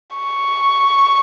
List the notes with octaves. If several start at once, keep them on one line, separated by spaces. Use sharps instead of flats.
C#6